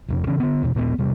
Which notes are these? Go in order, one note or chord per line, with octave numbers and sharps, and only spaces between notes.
E1 F2 C3
C#3 E3 C#4
D3 B3
E2 B2
D#2 A#2 G#3 B3
E1 C3 G3